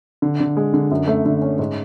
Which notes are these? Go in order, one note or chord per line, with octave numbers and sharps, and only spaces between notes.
D3
D3
G#3
D3
F#2
A3
D3
C#4
G#2